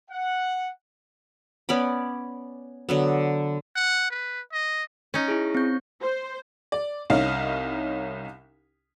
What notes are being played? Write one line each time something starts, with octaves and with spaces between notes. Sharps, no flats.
F#5
B3 C#4 D5 B5
D3 F#3 B3
F#5
B4
D#5
C#4 D#4
E4 G#4
C4 G6
C5
D5
C2 C#4 D#4 F5